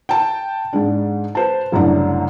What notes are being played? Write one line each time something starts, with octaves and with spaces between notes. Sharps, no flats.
G5 A5
G#2 G#3 D4
B4 C5 A5
F#1 C2 F#2 A2 D4